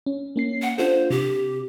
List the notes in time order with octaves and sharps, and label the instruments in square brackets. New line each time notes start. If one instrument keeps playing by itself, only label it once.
[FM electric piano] C#4
A#3 C#4 C7
[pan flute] F#5
[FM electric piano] D4 F4 A4 [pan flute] C5
[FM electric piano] C3 [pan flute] G4